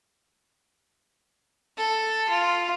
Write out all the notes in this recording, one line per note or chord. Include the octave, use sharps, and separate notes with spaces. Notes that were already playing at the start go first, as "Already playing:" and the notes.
A4
F4